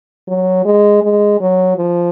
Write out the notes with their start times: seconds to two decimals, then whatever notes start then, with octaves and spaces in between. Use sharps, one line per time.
0.28 F#3
0.65 G#3
1.02 G#3
1.41 F#3
1.77 F3